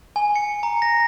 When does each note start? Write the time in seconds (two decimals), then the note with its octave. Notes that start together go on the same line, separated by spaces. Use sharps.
0.16 G#5
0.36 C#7
0.63 A#5
0.82 A#6